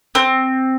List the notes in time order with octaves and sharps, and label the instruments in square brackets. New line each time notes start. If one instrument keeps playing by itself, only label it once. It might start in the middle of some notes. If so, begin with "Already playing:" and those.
[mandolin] C4